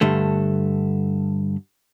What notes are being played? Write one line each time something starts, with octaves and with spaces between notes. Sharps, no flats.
G2 D3 A3